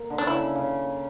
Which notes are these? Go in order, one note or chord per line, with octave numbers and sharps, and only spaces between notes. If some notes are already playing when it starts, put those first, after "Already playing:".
Already playing: A#3
D3
D4
C#3 E4
C#3